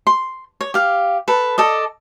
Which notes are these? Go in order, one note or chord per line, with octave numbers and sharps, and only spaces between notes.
C6
C#5
G4 F5
A4 B4
A4 D5 D#5